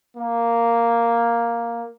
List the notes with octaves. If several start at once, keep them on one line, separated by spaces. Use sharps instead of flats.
A#3